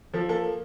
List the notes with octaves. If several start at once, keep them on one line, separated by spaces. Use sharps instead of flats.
F3 A4
A#3 A4